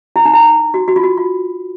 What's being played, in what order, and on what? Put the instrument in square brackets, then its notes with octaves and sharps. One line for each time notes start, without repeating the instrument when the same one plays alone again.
[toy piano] E4
D#4
E4
F#4
F#4
F4
F#4
F4